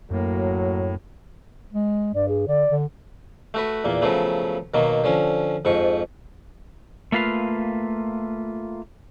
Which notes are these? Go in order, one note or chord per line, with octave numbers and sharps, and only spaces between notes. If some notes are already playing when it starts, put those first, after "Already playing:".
F#2 A2 F#3 A#3
G#3
G2 D5
G#4
D3 D5
D3
A3 F#4 B4
E2 A#2 A#3
C#3 F3 F#3 A3 B3
B2 D#3 F#3 A#3
D3 F3 C#4
F2 G#2 F3 C#6
A3 A#3 F4 B4 F5